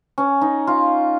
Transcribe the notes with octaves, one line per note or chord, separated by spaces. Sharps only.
C#4
D#4
F4